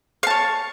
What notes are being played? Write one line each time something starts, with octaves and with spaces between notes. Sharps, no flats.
C#5 F5 A5